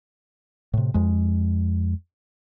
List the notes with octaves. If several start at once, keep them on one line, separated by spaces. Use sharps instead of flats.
A2 C3
F2 G#3